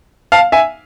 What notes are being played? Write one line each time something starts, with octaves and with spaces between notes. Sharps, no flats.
F5 A5
E5 G#5